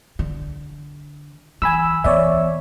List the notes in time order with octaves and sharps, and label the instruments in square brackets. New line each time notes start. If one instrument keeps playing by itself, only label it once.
[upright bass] D3
[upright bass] E3 [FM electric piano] G#5 B5 E6
[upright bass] E3 B3 [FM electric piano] C#5 D5 E5